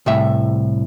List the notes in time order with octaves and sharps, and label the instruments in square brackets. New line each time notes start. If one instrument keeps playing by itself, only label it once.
[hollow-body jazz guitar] C2 A2 E5